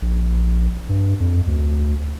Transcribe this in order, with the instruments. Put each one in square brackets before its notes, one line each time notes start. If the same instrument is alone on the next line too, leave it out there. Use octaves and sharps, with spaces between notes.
[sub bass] A#1
G2
F2
D2